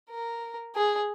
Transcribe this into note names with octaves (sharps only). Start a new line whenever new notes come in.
A#4
G#4